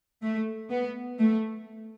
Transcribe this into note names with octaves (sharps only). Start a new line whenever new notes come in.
A3
B3
A3